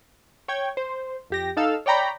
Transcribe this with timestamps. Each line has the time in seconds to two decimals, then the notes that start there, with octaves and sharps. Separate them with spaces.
0.48 C#5 G5 G#6
0.77 C5
1.30 F2 G4 A#6
1.57 D#4 A4 F5 E6
1.86 C#5 D5 G5 A#5 B5